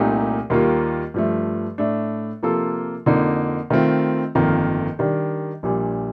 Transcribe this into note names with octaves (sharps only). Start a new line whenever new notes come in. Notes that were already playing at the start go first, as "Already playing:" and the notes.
Already playing: C2 A#2 A3 D#4 G4
D#2 D#3 G3 A#3 F4
G2 F3 A3
A2 A3 D4
C3 F3 A#3 F4 A4
F2 D3 F3 A#3 D#4
D#3 A3 C4 F4
G1 F2 D#3 A#3 F4
D#3 G3 D4
A#1 A#2 G3 D4